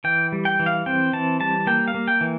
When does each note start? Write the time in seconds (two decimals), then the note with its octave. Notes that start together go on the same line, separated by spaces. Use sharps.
0.04 E3 G5
0.32 G3
0.45 G5
0.60 E3
0.66 F5
0.86 C4 G5
1.13 E3 A5
1.40 G3 A5
1.67 A#3 G5
1.88 F5
1.94 A#3
2.08 G5
2.21 E3